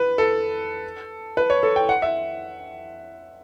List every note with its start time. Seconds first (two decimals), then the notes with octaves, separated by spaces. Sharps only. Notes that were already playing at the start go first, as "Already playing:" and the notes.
Already playing: B4
0.18 A4
1.37 B4
1.50 C#5
1.63 A4
1.76 G5
1.89 F#5
2.02 E5